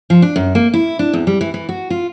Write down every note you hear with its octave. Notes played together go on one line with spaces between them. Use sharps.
F3
D4
F#2
A#3
E4
D4
E2
G3
E3
E3
F#4
F4